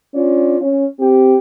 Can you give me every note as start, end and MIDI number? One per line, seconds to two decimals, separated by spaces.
0.15 0.58 61
0.15 0.58 62
0.15 0.58 65
0.15 0.58 74
0.61 0.86 61
1.00 1.36 60
1.00 1.36 67